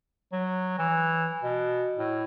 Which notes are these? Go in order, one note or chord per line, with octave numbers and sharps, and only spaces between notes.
F#3
E3
B2
A2